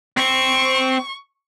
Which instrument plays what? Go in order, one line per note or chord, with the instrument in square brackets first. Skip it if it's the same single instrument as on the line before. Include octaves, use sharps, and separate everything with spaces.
[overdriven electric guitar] C4 [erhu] C#6